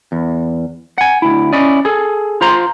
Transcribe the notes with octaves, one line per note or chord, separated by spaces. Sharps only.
E2
F#5 G#5
D2 E4
C#4 E4 D5 D#5
G#4 A4
F4 C5 A#5 C6